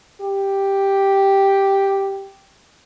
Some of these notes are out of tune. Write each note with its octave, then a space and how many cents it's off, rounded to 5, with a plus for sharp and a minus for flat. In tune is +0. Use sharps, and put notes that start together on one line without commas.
G4 +0